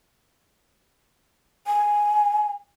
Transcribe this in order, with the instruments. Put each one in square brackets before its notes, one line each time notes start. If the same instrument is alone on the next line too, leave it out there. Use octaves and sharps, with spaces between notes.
[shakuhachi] G#5